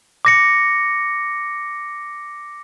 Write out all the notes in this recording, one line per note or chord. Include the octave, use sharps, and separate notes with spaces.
D6 A#6 C#7